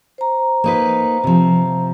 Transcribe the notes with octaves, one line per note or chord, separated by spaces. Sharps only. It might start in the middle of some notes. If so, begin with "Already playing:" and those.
C5 A#5
A#3 D#4 B4
C3 F3